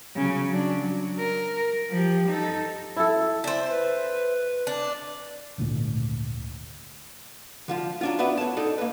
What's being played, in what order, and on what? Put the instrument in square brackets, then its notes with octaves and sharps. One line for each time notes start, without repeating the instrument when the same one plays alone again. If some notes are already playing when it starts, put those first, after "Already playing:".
[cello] C#3 F#3
F#3 D4
F#3
A#4
F3 G4
D#4 A4
[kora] E4 A4
[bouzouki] C5 E5 [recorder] D5
[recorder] B4
[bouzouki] D4
[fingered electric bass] G#1 D2 A#2 A3
[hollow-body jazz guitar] D3 F3 F4
F#3 D4 F4
B3 F#4 B4 D5 E5
C#5 A5
D4 D#4 A4 D5 D#5
A#3 B4